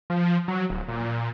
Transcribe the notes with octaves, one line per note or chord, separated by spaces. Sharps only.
F3
F#3
D1
A#2